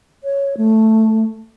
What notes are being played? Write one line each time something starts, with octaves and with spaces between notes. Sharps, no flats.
C#5
A3